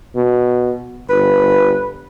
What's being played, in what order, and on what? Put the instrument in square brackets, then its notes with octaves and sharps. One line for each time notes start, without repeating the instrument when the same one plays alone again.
[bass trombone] B2
[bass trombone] G1 [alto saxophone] B4